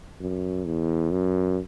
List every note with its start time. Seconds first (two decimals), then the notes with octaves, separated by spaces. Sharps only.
0.21 F#2
0.65 E2
1.11 F#2